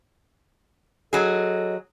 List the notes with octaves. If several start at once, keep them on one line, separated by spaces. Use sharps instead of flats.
F#3 G#4 A4 D#5